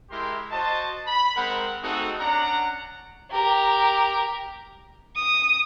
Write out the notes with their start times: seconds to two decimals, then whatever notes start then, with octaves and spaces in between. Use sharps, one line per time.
0.10 G#3 E4 G4 A#4 C6
0.51 F#4 C5 D#5 A5
1.06 B5
1.36 G#3 C4 A#4 C5 F#5
1.82 A3 C4 D#4 F#4 G#4 A4
2.20 C#4 D4 D5 F#5 A#5
3.31 G4 A#4
5.15 D#6